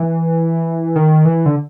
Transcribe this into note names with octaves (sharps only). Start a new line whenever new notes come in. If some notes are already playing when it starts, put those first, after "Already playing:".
Already playing: E3
D#3
E3
D3